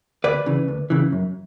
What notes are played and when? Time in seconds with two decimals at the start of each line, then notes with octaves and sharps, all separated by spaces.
0.24 D2 B4 D5
0.46 C#3 E3
0.68 D2
0.90 C#3 E3
1.12 F#2